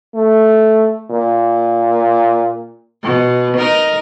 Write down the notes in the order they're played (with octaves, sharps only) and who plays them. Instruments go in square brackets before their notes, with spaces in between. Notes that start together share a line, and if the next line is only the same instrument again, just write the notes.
[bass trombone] A3
A#2
[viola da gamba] B2
D#4 A#4